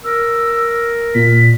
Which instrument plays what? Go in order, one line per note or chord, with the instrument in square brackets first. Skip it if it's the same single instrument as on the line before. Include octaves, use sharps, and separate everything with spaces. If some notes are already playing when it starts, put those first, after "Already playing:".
[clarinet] A#4 [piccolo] E6
[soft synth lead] A#2 [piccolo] B6